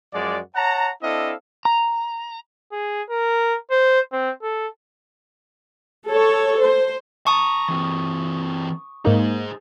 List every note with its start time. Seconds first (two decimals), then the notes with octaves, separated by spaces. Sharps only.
0.14 F#2 F3 G#3 F#4 D5
0.56 C#5 F#5 A5 A#5
1.03 C4 D4 E4 A4 D#5 F5
1.65 A#5
2.72 G#4
3.10 A#4
3.71 C5
4.13 C4
4.43 A4
6.07 A4 C#5
6.61 C5
7.27 A5 A#5 C#6 D#6
7.68 E3 C4
9.05 G#2 A#3 D#4 G#4 C5